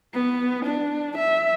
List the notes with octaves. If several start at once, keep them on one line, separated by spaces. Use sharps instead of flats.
B3
D4
E5